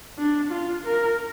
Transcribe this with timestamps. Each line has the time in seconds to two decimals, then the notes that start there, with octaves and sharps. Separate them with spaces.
0.18 D4
0.51 F4
0.84 A#4